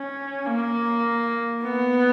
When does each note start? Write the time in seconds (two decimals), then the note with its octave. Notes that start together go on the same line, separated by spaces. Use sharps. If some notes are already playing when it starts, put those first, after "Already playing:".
Already playing: C#4
0.46 A#3
1.63 B3